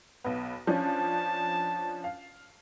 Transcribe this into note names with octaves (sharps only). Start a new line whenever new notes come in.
B1 B3
F3 C#4 D4 A5
F5